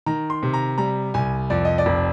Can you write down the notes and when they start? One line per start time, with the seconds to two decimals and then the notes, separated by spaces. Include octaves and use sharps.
0.06 D#3 A#5
0.30 C6
0.43 C3
0.53 A#5
0.78 G3 A#5
1.14 C2 G#5
1.50 F2 D5
1.65 D#5
1.78 D5
1.86 F1